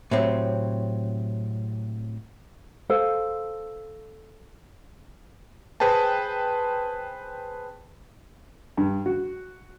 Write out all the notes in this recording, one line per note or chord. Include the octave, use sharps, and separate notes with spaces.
A2 C3 F#3 C4
A4 C5 F5
G#4 B4 C5 G5 A5
G2
F#4